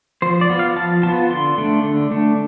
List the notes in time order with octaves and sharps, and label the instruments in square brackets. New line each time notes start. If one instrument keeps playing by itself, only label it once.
[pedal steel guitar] F3 C5
D5
B3 F4
F5
F3 A5
B3 F4 A5
D3 C6
A3 D4
D3
A3 D4